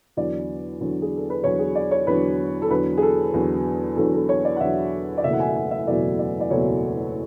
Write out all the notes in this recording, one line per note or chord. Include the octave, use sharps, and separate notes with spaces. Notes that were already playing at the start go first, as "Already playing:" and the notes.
E2 D3 F#3 D5
E2 D3 F#3
G#4
A4
B4
E2 D3 F#3 C#5
G#4
D5
C#5
E2 D3 F#3 B4
A4
E2 D3 F#3 B4
G#4
A4
E2 D3 F#3
E2 D3 F#3 A4
A4
C#5
D5
F#5
E2 D3 F#3 E5
D5
F#1 E2 B2 F#3 A3 E5
F#5
G#5
E5
F#5
E5
F#1 E2 B2 F#3 A3 D5
D5
D5
F#1 E2 B2 F#3 A3 C#5